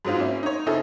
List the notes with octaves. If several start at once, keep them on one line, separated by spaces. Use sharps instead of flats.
G#2 F#3 C4 D#4 F4
A#3 C4 C#4 E4
D#4 C#5
C#3 C4 D#4 E4 G#4 A4